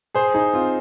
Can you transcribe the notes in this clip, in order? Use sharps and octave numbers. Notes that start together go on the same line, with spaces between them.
G#4 C5
D#4 G#4
C4 F4